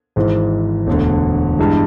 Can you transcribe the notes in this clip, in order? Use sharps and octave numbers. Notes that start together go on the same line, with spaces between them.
G#1 G#2 E3
E1 D2 D3
G2 E3 G#3